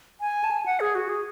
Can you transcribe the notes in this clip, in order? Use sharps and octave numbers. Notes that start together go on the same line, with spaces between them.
G#5
A5
G#5
F#5
G#4
F#4
G#4